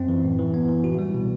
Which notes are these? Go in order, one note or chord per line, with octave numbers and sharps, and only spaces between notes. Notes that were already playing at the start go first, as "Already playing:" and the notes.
Already playing: F#2 C4
E3
A2
E3
B3
E3
F#4
G3
B2